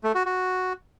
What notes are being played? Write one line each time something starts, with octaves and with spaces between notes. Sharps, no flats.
A3
F#4
F#4